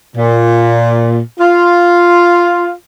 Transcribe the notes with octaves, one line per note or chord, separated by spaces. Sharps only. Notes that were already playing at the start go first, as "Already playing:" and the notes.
A#2
F4